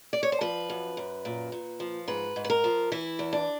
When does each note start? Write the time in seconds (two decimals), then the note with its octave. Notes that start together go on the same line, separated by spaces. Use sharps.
0.13 D5
0.23 C#5
0.32 C5
0.41 F3 B4
0.70 F#2
0.97 F#2
1.25 A#2
1.52 A#2
1.80 F3
2.08 G#2 B4
2.36 G#2
2.44 B4
2.50 A#4
2.64 F3
2.92 E3 E4
3.19 E2
3.33 D4